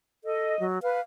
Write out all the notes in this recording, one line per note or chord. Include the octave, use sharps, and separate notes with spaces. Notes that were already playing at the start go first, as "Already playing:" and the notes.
A4 D#5
F#3
B4 F5